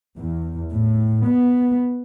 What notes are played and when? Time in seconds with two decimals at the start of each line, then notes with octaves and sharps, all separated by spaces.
0.17 E2
0.72 A2
1.24 B3